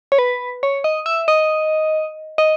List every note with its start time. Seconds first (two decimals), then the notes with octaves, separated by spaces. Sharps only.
0.12 C#5
0.19 B4
0.63 C#5
0.84 D#5
1.06 E5
1.28 D#5
2.38 D#5